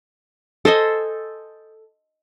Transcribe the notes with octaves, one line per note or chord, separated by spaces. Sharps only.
A4 C5 D#5 G#5